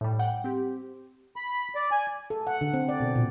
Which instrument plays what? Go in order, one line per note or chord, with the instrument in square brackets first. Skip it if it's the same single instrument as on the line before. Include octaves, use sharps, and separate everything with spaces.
[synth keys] A2 G3
F#5 G5
C4 G4
[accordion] B5
D5
G#5
[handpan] A4
F#5
D3
C4
D5
B2
A#2